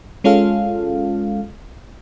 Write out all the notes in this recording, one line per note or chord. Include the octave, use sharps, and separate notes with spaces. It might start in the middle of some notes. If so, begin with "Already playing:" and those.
G#3 C#4 F4 A4 F5